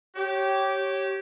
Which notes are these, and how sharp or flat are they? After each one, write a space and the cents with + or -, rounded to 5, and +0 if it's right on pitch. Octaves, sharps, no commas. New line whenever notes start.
G4 -20 C#5 -10